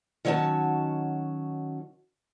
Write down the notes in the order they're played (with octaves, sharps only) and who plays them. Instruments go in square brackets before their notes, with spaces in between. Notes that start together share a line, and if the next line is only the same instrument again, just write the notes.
[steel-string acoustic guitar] D#3 F#3 C#4 F#4 A5